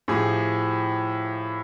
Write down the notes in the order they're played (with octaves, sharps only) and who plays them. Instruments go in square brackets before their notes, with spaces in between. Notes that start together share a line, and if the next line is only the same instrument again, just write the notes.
[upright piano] A2 F3 G4 G#4